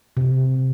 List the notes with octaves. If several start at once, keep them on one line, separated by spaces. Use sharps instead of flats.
C3